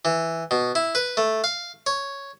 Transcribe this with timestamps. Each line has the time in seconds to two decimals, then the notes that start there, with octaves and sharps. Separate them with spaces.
0.05 E3
0.51 B2
0.75 E4
0.95 B4
1.17 A3
1.44 F5
1.87 C#5